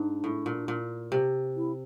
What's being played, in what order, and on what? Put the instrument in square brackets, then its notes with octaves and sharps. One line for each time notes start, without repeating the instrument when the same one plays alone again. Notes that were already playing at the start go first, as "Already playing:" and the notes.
Already playing: [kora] G#2 [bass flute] D4
[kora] A2
A#2
A#2
C3
[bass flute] E4